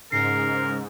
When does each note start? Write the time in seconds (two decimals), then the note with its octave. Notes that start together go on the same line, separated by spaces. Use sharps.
0.12 G#2 C#3 A#4 C7